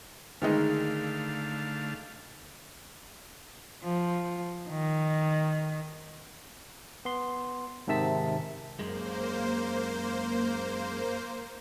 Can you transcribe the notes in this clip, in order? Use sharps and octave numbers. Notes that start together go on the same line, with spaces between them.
D3 D#3 G#3 A3 D#4 F5
F3
D#3
B3 C6
G#2 C3 D#3 E5 A5 B6
F#2 G#3 A#3 C5